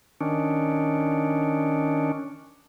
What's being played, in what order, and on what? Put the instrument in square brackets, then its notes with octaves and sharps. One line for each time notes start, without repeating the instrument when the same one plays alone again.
[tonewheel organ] D#3 C#4 D4